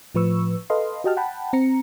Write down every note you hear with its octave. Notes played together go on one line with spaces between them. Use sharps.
A2 F3 B4 C#6 E6
A4 B4 D#5 F5 C6
F#4 G4 D#5 G5 A5 F6
F#5 G5 A5 B5
C4 A#5 C#7